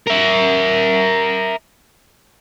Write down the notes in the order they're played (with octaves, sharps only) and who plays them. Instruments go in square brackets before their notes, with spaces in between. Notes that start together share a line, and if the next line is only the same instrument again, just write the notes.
[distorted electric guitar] A#4 E5